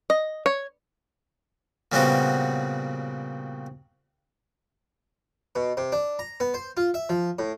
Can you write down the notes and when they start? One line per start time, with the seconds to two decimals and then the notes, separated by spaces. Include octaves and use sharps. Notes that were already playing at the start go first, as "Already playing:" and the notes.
0.10 D#5
0.46 C#5
1.92 A#2 C#3 G3 B3 C4 F#4
5.56 B2
5.77 C3
5.92 D4
6.19 A#5
6.40 B3
6.54 C5
6.77 F4
6.94 E5
7.09 F3
7.39 A2